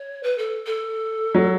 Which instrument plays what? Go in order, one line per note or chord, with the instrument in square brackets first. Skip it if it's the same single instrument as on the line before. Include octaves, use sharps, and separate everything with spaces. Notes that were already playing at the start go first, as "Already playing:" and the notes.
Already playing: [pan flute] C#5
B4
A4
A4
[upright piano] F#3